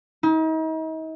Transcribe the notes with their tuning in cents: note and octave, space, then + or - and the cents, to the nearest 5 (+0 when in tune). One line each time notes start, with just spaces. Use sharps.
D#4 +40